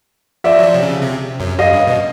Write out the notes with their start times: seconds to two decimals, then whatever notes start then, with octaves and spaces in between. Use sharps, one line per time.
0.44 F3 D5 E5
0.59 F#3
0.64 F3
0.74 C3
0.83 C#3
1.02 C3
1.40 F#2
1.59 F#2 D#5 F5
1.73 G2
1.87 B2